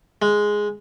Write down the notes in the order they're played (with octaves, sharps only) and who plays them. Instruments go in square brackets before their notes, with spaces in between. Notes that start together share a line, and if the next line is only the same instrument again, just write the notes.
[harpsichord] G#3